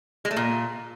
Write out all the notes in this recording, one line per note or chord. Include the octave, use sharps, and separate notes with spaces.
G#3
A3
A#2